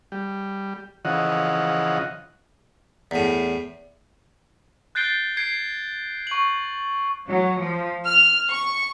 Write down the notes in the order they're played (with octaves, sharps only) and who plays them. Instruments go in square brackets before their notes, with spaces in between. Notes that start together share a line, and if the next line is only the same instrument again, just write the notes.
[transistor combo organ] G3
C#3 E3 F3 D#5 F#5
[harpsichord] E2 A2
[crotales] F#6 G6 A6 C7 D7 G7
G#6 C7 D7
C#6 F#7
[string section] F#3
F3
F6
C#6